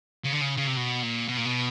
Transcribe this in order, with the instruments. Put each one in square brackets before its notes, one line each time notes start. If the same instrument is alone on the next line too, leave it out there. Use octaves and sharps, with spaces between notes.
[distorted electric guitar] C#3
D3
C#3
C#3
C3
B2
A#2
B2
A#2
B2